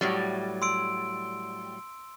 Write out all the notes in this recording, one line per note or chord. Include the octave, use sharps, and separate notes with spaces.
A2 F#3 G3
C6 E6 D7